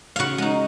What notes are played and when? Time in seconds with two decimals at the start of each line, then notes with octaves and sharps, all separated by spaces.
0.16 C#3 F#4 F5 F#5
0.38 G#3 D#4